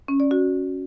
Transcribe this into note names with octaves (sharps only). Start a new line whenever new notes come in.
C#4
D5
F#4